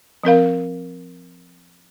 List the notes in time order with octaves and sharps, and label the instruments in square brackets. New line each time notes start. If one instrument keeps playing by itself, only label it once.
[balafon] F3 C4 A#4 F5